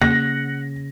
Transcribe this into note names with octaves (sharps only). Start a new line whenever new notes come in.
C#3 A#3 F#5 A#6